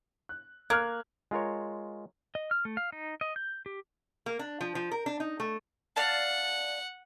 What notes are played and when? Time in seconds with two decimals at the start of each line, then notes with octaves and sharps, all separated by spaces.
0.29 F#6
0.70 A#3 F6 F#6 G#6
1.31 G#3 F4 A#4 C#5
2.35 D#5
2.51 F6
2.65 A3
2.77 F5
2.92 D#4
3.21 D#5
3.36 G6
3.66 G4
4.26 A#3
4.39 D4
4.61 F3
4.75 F3
4.91 A#4
5.06 D4
5.20 D#4
5.40 A3
5.96 D5 F5 F#5 A5